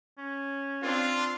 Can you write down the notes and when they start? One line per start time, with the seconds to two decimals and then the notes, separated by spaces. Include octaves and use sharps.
0.18 C#4
0.83 C4 D4 F4